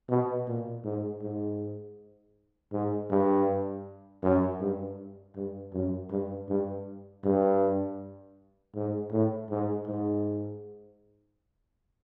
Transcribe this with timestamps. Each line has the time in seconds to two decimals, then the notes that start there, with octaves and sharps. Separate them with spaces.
0.09 B2
0.47 A#2
0.84 G#2
1.22 G#2
2.72 G#2
3.11 G2
4.23 F#2
4.61 G2
5.36 G2
5.73 F#2
6.11 G2
6.49 G2
7.24 G2
8.75 G#2
9.12 A2
9.50 G#2
9.87 G#2